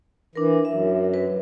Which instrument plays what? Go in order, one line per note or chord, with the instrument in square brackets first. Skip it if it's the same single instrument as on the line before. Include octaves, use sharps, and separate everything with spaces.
[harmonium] E3 [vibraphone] D4 A#4
[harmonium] F#2 [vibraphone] E5
[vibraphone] B4